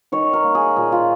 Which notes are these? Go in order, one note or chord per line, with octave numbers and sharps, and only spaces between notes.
D#3 C#5
A#4
A#3
G#4
A#2 G#4
F4